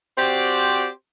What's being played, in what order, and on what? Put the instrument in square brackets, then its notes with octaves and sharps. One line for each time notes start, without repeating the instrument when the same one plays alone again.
[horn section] C4 F#4 G4 C5 D5